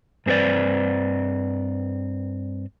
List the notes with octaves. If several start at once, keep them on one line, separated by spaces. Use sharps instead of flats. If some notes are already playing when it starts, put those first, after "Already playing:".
G2 C4 G#4 B4 D5